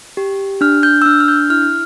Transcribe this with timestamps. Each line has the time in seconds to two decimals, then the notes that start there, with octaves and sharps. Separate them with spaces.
0.17 G4
0.61 D4 F6
0.83 G6
1.02 E6
1.06 D4 F6
1.20 F6
1.28 G6
1.50 E4 F6